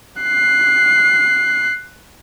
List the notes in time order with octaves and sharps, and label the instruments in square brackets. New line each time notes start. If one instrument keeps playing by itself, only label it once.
[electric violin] F#6 C7